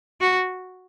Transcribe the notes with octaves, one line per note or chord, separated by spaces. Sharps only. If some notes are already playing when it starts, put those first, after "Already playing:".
F#4